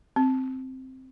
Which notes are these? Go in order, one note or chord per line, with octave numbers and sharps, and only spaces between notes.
C4